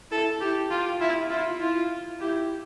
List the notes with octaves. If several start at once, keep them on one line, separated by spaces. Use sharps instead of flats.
E4 A4
E4 G4
F4 G4
E4 F4
E4 F4
E4 F4
E4 G4